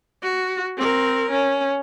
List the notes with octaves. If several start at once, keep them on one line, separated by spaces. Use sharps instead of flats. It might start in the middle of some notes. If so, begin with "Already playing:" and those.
F#4
C4 A#4
C#4